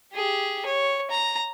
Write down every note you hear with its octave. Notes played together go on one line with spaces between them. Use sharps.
G4 G#4
C#5
A#5